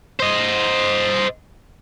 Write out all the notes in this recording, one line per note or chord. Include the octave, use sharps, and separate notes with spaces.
C5 D#5